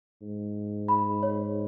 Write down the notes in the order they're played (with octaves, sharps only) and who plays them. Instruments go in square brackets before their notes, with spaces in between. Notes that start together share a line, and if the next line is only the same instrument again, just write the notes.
[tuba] G#2
[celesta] B5
C#5